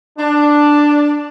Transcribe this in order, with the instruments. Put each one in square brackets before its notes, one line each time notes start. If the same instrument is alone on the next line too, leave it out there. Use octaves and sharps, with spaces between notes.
[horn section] D4